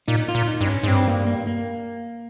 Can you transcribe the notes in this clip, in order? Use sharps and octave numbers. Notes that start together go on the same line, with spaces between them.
A#2 D#4
F4
A#2
D#4
G2
C#4
G#2
G2 C4
A#3
A#3
A#3